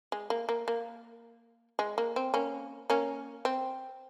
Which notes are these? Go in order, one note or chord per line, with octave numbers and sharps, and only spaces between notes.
G#3
A#3
A#3
A#3
G#3
A#3
C4
A#3 C#4
A#3 C#4
C4